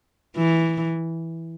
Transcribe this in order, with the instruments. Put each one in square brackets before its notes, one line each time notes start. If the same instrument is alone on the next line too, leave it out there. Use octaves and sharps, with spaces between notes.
[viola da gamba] E3